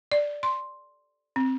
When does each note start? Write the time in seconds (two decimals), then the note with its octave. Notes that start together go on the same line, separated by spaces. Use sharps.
0.12 D5
0.43 C6
1.36 C4